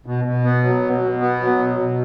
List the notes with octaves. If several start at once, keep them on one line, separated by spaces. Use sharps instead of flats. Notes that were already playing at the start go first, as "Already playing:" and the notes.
B2
B2
B3
F#3
B2
B2
B3
F#3
B2
B2